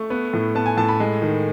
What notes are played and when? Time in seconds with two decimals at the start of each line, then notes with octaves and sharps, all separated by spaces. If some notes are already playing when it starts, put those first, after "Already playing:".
Already playing: A3 C#6
0.10 B3
0.33 A2
0.55 B3 A5
0.66 G#5
0.77 A2 A5
0.88 B5
1.00 G#3
1.22 D#3